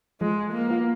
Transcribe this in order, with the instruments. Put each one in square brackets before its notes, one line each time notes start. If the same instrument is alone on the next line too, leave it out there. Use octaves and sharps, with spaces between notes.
[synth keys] F3 [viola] G#3
[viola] A#3
[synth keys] B3 F4